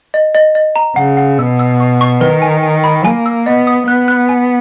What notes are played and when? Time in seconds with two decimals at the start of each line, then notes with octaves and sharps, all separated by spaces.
0.14 D#5
0.35 D#5
0.55 D#5
0.76 A#5
0.96 C#3 F#5
1.17 F#5
1.38 B2 E6
1.59 E6
1.80 C#6
2.01 C#6
2.21 D#3 B4
2.42 G#5
2.63 G#5
2.84 B5
3.05 A#3 G#5
3.26 E6
3.46 B3 D#5
3.67 D#6
3.87 B3 F#6
4.08 F#6
4.29 G#5